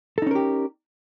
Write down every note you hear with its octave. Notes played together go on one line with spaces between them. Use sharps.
C#4 D#4 G4 A4 A#4